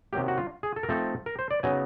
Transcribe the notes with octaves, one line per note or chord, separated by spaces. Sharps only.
C3 D#3 F#3 A#3 G4
F#4
F4
G#4
A4
A#4
F3 A3 C4 D#4 A4
A#4
C5
D5
C#3 F#3 B3 D#4 G#5